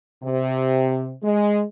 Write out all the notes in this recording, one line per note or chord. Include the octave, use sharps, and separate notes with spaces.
C3
G#3